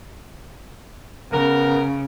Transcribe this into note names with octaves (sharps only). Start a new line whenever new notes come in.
C#3 B3 A#4